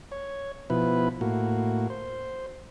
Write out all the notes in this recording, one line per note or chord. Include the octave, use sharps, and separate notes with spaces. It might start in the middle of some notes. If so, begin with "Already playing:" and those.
C#5
B2 F3 E4 B4
A2 A#3 F#4
C5